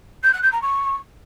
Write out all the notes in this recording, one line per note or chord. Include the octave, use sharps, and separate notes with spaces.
G6
F#6
G6
A#5
C#6